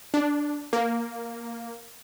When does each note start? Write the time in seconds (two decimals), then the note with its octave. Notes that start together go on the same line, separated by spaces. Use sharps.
0.14 D4
0.73 A#3